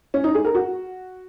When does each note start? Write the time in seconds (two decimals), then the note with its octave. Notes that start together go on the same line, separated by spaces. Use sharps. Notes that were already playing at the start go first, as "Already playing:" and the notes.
0.14 C#4
0.24 D#4
0.35 G#4
0.45 A#4
0.55 F#4